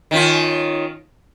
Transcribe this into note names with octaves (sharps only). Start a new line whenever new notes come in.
D#3 C#4 F4